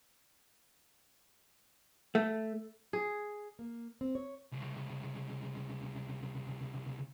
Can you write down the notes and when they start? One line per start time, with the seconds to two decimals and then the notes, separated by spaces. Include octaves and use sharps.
2.15 A3
2.93 G#4
3.59 A#3
4.01 C4
4.15 C#5
4.52 C2 C#3